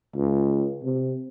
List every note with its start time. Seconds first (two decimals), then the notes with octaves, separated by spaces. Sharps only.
0.15 C#2
0.83 C3